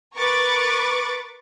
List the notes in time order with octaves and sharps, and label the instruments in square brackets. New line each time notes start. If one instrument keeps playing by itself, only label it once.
[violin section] A#4 B4 C#6 D6 A6